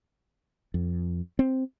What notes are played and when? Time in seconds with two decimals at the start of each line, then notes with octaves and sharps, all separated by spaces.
0.74 F2
1.39 C4